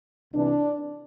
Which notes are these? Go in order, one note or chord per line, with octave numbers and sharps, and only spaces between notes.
C2 C3 E3 D4